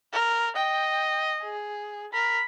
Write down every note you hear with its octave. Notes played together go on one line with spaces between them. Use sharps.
A#4
D#5 G5
G#4
A#4 B5